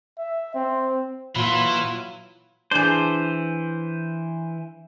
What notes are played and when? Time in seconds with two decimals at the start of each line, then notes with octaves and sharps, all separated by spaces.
0.18 E5
0.55 C4
1.36 A#2 E3 F#3 E4 F4 B5 C6
2.71 E3 D4 G#4 C5